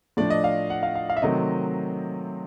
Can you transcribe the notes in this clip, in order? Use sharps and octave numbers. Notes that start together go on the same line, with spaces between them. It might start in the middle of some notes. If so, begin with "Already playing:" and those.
A2 F3 A3 D4 D5
D#5
F5
F#5
F5
F5
F5
E5
C3 D#3 F#3 A3 C4 D#5